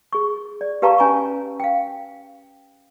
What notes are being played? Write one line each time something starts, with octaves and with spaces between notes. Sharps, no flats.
G#4 C#6
D5
G4 B4 F5 A5 A#5 C#6
C#4 G#5 A#5 C#6
F5 G5